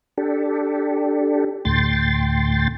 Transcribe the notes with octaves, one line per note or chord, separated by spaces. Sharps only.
D4 G4 A4
D2 A2 G5 C6 A6